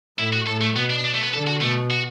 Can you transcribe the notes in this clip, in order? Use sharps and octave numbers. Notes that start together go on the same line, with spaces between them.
A2 E4
F#4
A2 A4
A3
B2 B3
D4
D4
A3
B3
D3 A4
F#4
B2 A3
F#4